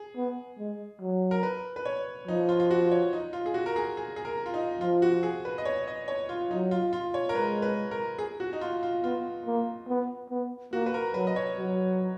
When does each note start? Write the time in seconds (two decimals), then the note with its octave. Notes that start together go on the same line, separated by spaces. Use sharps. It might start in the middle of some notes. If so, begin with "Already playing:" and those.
Already playing: G#4
0.17 B3
0.59 G#3
1.01 F#3
1.31 A#4
1.43 B4
1.76 B4
1.85 C#5
2.28 F3 D#4
2.49 F4
2.60 F4
2.71 F#4
2.91 C#5
3.13 D#4
3.33 F4
3.46 G#4
3.54 F#4
3.66 A#4
3.76 G#4
3.97 G#4
4.16 G#4
4.25 A#4
4.46 F4
4.54 D#4
4.81 F3 F4
5.02 F#4
5.23 G#4
5.45 B4
5.58 D#5
5.65 C#5
5.87 D#5
6.08 C#5
6.29 F4
6.50 F#3 D#4
6.71 F4
6.93 F4
7.14 C#5
7.29 A#4
7.35 G#3 B4
7.62 B4
7.91 A#4
8.18 G#4
8.40 F#4
8.53 D#4
8.61 F4
8.83 F4
9.04 B3 F4
9.46 A#3
9.88 B3
10.30 B3
10.73 A#3 F#4
10.86 B4
10.94 A#4
11.14 F#3 B4
11.27 D#5
11.36 C#5
11.57 F#3